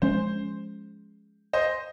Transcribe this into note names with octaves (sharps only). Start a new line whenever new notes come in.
F3 G#3 C#4 C5
C5 D#5